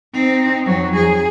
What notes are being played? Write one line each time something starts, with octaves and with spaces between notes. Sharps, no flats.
C4 D#4
F2 F#3
G#4